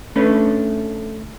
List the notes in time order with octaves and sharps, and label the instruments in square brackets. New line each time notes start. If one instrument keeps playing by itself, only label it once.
[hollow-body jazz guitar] A3 C#4 D4 B4